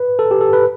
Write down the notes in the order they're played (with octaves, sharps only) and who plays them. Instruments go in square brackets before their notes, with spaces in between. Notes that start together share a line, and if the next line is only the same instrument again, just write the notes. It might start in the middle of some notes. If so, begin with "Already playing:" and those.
Already playing: [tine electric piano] B4
A4
G4
A4
B4